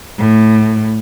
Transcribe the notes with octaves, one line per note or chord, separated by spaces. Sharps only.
A2